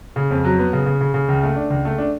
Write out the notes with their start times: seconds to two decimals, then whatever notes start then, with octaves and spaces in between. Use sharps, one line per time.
0.16 C#3
0.31 F2
0.45 F#3
0.59 B3
0.73 C#3
0.86 C#3
1.01 C#3
1.14 C#3
1.28 C#2
1.43 A3
1.56 D4
1.70 C#2
1.85 A3
1.98 D4